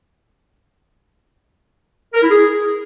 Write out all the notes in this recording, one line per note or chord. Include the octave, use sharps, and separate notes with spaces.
A#4
E4
G#4